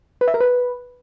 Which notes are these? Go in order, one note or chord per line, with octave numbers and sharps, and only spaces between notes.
B4
E5
A#4
B4